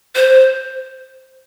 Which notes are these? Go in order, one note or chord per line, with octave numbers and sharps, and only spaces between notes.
C5